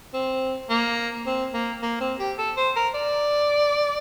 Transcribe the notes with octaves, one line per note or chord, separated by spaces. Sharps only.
C4
A#3
C4
A#3
A#3
C4
G4
A4
C5
A#4
D5